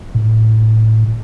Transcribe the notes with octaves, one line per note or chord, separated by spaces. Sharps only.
A2